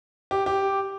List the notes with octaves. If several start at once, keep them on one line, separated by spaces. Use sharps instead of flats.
G4
G4